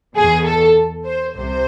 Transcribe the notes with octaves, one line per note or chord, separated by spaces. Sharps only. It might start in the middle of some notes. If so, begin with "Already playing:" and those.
E2 B2 G#4
A4
C5
C2 C3 C5